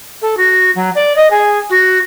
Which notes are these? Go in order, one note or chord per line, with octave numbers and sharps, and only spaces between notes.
A4
F#4
F#3
D5
D#5
G#4
F#4